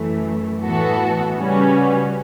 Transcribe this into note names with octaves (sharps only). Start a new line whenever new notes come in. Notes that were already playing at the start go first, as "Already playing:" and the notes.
Already playing: F#2 E3 A3
A2 E3 B3 F#4 A4
C#3 G3 C#4 F#4 B4